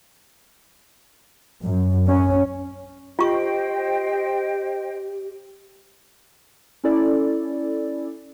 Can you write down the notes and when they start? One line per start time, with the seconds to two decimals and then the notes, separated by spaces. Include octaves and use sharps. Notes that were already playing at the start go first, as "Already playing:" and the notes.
1.65 F#2
2.07 C#4
3.19 F4 G4 C5 D#5 G5 C#6
6.84 C#4 E4 A4 D5